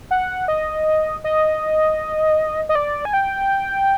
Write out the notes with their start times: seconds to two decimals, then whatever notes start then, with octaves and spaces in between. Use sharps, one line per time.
0.11 F#5
0.48 D#5
1.24 D#5
2.69 D#5
2.75 D5
3.05 G#5
3.13 G5